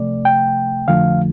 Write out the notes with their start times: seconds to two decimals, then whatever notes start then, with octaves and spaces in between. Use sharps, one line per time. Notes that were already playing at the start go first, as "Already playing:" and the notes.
Already playing: C3 F3 A3 D5
0.25 G5
0.88 F2 D3 F3 A3 F5